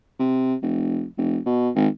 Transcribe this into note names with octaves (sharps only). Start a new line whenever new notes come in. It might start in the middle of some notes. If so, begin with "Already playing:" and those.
C3
F1
F1
B2
G#1